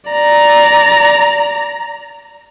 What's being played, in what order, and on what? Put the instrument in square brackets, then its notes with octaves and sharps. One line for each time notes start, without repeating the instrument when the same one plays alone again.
[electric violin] D5 A#5